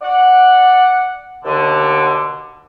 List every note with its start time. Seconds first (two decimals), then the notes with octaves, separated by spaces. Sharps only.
0.02 D5 F#5
1.44 D#2 B2 D3